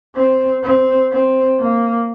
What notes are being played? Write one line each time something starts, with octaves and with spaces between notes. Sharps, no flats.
C4
C4
C4
A#3